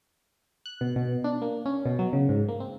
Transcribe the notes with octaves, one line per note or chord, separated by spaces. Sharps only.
F#6
B2
B2
D4
A#3
C#4
B2
F#3
C#3
G#2
A#3
C4